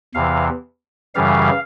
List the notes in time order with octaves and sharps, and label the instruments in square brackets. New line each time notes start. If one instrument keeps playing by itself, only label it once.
[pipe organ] E2 C3 E3 F5
F#2 C#3 E3 G3 F5